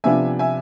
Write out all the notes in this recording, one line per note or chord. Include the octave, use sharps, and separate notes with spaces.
C3 F3 B3 D4 E5 G#5
E5 G#5